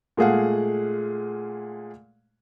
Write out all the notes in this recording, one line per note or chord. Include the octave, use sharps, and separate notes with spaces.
A#2 G#3 A3 G#4 F5 F#5